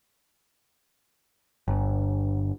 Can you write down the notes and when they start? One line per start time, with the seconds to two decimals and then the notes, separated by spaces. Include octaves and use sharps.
1.68 G1